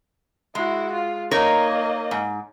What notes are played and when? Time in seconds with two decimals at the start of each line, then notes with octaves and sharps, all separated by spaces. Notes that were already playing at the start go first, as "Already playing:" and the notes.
0.55 G#3 E4 F#4
0.92 F4
1.31 A#3 D#4 A#4 C#5 D#5
2.11 G#2